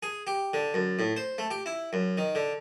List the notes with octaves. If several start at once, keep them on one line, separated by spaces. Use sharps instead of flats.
G#4
G4
D3
F#2
A2
C5
A3
G4
E4
F#2
D#3
D3